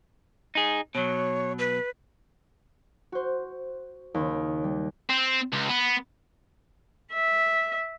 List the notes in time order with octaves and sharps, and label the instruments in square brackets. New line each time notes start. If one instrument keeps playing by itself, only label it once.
[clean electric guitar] D#4 G#4
[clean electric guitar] B2 F#3 [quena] C#5
[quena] B4
[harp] F#4 C5
D#2 C#3
G3
[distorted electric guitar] C4
C#2
B3
[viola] E5